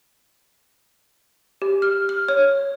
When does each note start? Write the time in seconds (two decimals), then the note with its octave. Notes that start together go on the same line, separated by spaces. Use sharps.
1.62 G4
1.82 F6
2.09 F6
2.29 C#5